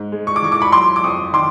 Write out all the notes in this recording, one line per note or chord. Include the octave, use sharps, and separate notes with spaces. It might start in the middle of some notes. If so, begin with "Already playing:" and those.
Already playing: G#2
G#3
C#6
D6
E3 C#6
D6
B5 C#6
F#3 C6 D6
D6
F2 C#6 D#6
D#3 C6 D6